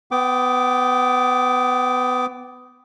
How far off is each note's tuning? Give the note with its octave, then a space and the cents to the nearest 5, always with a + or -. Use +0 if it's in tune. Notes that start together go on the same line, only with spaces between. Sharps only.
B3 +20 G5 -15 D6 +0